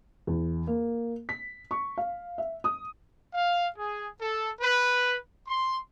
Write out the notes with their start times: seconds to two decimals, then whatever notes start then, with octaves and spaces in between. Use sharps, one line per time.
0.27 E2
0.67 A#3
1.29 B6
1.71 C#6
1.98 F5
2.38 E5
2.64 D#6
3.33 F5
3.77 G#4
4.20 A4
4.61 B4
5.47 C6